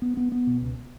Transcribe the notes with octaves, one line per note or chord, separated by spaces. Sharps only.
B3
B3
B3
B2
C#2